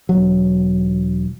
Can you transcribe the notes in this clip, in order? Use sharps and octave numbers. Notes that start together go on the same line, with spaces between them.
E1 F#3